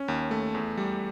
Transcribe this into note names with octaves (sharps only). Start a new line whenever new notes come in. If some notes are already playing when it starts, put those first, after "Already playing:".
Already playing: C#4
D#2
A3
E2
G3